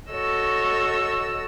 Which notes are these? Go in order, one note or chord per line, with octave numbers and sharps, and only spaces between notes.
F#4 A4 C#5 D#5 E6